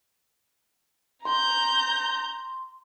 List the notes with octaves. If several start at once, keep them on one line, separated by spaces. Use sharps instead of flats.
A#5 C6 G6